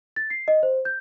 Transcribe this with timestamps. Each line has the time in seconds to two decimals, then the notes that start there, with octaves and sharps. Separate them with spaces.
0.16 A6
0.30 C7
0.48 D#5
0.63 C5
0.85 G6